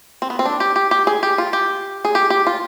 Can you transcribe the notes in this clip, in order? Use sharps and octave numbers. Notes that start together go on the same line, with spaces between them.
C4
B3
C4
D4
G4
G4
G4
G#4
G4
F4
G4
G#4
G4
G4
F4